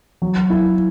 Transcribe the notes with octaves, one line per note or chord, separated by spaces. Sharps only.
F#3
E4